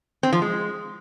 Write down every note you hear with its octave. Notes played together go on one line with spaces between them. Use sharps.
C4
F3
G#3